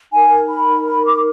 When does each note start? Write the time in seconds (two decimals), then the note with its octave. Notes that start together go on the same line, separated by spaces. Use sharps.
0.12 D#4 A#4 G#5
0.49 B5
0.87 B5
1.05 D6